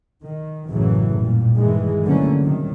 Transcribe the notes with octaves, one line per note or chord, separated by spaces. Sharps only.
D#3
A1 F#2 C#3 E3 F#3 A3
A#2 G3
G2 D#3 E3 G#3
D3 E3 F#3 A3 A#3 C#4
C3 D#3 F#3 G3